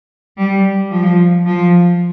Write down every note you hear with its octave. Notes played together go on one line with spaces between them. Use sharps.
G3
F3
F3